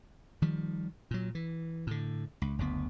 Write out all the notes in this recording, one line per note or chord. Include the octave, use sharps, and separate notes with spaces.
D#3 F3 G3
A#2 F#3
E3
A2 D3
C#2
F#1 D2 C#3 B3